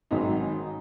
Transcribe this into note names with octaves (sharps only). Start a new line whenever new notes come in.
G#1 G#2 D#3 F#3 D#4